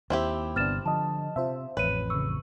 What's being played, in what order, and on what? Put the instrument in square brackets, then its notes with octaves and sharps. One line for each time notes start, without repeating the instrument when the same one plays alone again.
[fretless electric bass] D#2 [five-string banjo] C4 E4 G4
[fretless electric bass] G1 C3 [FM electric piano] B3 D4 [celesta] F6 A6 E7
[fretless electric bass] D3 [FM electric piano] F3 D#5 [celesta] A5
[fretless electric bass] C3 [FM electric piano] F4 C5 E5
[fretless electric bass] A1 F2 [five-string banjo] B4 [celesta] C#5 D#7
[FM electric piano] C#3 C#6 [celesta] E6